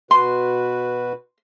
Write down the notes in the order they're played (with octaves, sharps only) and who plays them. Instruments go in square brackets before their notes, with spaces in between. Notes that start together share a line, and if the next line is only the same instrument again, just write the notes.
[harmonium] B2 F#4 B4 [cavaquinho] C6